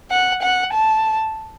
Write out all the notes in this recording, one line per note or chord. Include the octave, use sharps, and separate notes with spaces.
F#5
F#5
A5